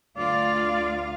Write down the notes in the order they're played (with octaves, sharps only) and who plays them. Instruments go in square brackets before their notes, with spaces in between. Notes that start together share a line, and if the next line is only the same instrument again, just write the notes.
[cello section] D2 F4 F5 [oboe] D5